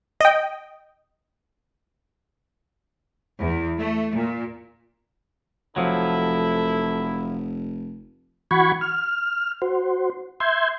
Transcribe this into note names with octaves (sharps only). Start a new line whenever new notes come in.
D#5 G5
E2
A3
A#2
F1 F3 F#3 E4 A4
E3 F#4 F#5 B5 C#6 G#6
F6
F#4 C5
E5 C6 G6 G#6